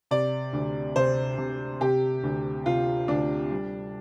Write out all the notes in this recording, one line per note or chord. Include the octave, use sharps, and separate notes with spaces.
C3 D5
D2
C3 C5
C3
C3 G4
D2
C3 F4
D2 D4
G3